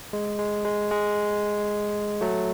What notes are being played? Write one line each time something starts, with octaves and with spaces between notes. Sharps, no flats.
G#3
G#3
G#3
G#3
F#3 A3